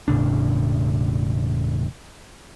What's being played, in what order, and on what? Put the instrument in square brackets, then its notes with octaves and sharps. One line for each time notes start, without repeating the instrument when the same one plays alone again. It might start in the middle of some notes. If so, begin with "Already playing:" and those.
[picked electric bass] E1 A2 C#3 D4